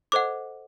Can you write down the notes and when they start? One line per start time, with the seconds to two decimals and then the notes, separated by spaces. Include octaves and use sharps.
0.12 A4 C5 D#5 F#5 D6